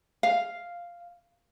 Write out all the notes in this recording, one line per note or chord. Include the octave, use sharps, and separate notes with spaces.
F5